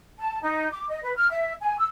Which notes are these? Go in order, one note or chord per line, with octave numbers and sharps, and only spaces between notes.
A5
D#4
D6
D#5
B4
F6
E5
G#5
E6